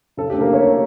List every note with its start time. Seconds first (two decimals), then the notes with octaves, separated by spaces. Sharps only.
0.17 C#3 A4
0.30 G4
0.33 D2
0.41 A#3 A#4
0.50 D2 C#4 C#5
0.65 C#3